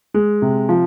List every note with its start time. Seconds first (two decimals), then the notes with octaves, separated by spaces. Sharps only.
0.14 G#3
0.42 C3
0.69 F3